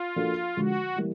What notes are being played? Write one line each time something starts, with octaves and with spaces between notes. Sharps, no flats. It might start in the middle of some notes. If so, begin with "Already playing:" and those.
Already playing: F4
F3 A#3 D4 F#4 A4
D3 F3 G#3 F#4
E3 G3 A#3